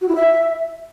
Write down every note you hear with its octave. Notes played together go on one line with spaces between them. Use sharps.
F#4
E4
E5